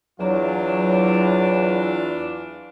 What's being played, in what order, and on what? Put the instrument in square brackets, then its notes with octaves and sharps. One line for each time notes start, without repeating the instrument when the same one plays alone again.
[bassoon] E2 [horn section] E3 D4 F4 [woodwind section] F#3